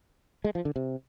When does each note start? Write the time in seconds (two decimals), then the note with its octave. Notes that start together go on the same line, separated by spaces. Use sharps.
0.44 G#3
0.55 F3
0.65 D3
0.76 C3